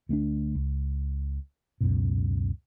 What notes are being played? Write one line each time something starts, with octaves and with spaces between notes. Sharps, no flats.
D2 A3 B3 D4
C#2
C#2 F#2 B2